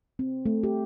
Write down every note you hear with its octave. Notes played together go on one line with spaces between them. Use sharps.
C4
A3
G4